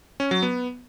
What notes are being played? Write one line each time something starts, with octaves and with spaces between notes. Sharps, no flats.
C#4
F#3
B3